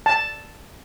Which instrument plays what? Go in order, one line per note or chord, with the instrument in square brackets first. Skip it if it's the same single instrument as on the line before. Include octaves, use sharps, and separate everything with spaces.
[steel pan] A5